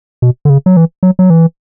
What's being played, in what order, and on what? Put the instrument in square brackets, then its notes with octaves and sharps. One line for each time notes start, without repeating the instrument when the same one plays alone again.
[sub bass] B2
D3
C#3
F#3
E3
F#3
F#3
E3